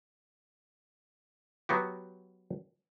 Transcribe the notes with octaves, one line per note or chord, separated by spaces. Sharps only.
F#3 B3 F#4 G4